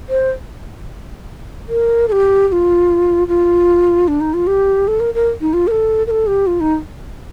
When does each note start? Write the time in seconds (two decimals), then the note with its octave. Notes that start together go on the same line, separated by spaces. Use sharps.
0.09 C5
1.68 A#4
2.08 A4
2.12 G4
2.48 G4
2.52 F4
3.28 F4
4.08 D4
4.21 D#4
4.34 F4
4.47 G4
4.88 A4
5.00 A#4
5.14 A#4
5.41 D#4
5.53 F4
5.67 A#4
5.71 A4
6.07 A#4
6.11 A4
6.27 G4
6.47 F4
6.60 D#4